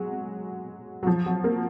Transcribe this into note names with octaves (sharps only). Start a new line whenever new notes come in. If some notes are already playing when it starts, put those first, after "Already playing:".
Already playing: F#3 G#3
F#3
F3
F#3
A#3